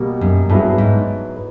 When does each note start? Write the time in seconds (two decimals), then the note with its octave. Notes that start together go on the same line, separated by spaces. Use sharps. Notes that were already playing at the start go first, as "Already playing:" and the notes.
Already playing: B2 G3 A#3
0.21 F#2
0.50 G2 F#3 B3 E4 G#4 B4
0.78 G#2
1.36 B4